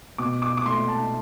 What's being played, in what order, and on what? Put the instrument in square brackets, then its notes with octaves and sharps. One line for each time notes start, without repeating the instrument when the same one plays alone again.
[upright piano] B2 D6
D6
D6
A3 C6
A5